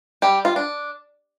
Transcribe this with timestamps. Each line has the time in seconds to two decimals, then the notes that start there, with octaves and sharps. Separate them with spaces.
0.22 G3 G4
0.45 F4
0.56 D4